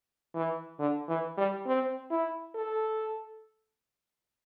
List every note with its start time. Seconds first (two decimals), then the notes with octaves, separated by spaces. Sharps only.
0.35 E3
0.80 D3
1.09 E3
1.38 G3
1.67 C4
2.11 E4
2.55 A4